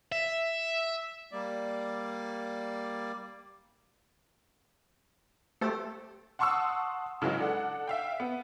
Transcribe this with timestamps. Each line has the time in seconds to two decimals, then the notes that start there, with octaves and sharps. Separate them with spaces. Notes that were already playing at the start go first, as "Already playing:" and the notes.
0.12 E5
1.31 G3 A#3 D5
5.61 A3 G4 A4 C5
6.39 F#5 A5 C6 C#6 D#6 E6
7.22 C#3 E3 F#3 G#3
7.39 D4 A4 F#5
7.87 E5 F5 G5
8.20 B3